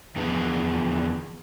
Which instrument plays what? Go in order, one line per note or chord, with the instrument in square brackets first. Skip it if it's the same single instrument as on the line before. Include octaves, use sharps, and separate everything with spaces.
[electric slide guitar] E2 D3 F3 B3 G#4 B4